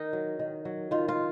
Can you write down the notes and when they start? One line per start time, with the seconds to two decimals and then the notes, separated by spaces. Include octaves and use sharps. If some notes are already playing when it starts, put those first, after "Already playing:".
Already playing: D#3 D#4 A#4
0.13 F#3
0.39 D#3
0.65 F#3
0.91 D#3 F4
1.08 F4